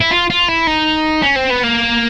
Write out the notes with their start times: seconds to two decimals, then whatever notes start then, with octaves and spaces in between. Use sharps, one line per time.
0.01 E4
0.11 F4
0.30 F4
0.49 E4
0.67 D#4
1.23 C#4
1.36 C4
1.51 B3
1.64 A#3